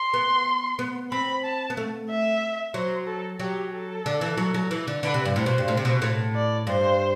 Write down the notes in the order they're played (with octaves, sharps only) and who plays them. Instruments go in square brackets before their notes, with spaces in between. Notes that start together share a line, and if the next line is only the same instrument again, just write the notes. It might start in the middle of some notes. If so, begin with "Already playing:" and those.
Already playing: [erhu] C6
[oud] B3
B3
[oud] C4 [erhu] B5
[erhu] A5
[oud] B3
A3
[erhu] E5
[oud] F#3 [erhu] C5
[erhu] A4
[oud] F#3 [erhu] G4
[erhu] A4
[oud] D3
E3
F#3
F#3
E3
D3
[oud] D3 [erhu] B4
[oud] C3
G2
[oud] A2 [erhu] C5
[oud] B2
G2
A2
C3
B2
A2
[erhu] D5
[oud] G2 [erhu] C5